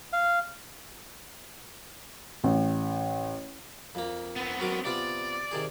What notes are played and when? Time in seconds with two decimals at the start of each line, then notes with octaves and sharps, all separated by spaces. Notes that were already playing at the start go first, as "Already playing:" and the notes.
0.13 F5
2.44 A1
3.95 F2 A#3
4.36 B3 C4
4.60 F#3 A#4 D6
4.85 C3 B3 F4 D5
5.51 C3 D#3 G#4